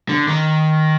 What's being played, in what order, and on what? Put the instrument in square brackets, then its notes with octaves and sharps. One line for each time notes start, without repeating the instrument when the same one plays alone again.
[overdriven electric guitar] D3
D#3